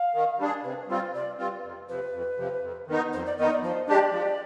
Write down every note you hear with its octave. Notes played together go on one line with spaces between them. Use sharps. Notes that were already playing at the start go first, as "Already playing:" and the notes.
Already playing: F5
D#3
G3 D4 G#4
C3 B4
G3 C4 F4 C5
C3 D5
G3 C4 F4 B4
F2
C3 F3 B4
F2
C3 F3
F2
D#3 B3 D#4
F2 C5
D5
D#3 B3 D#4 D#5
D5
F3 C5
G#3 D4 G4 D5
F3